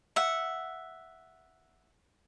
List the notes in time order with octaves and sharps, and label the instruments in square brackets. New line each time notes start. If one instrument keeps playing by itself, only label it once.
[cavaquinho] E5 F#5